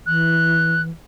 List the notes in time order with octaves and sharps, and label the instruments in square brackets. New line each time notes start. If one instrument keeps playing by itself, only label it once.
[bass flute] E3 [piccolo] F#6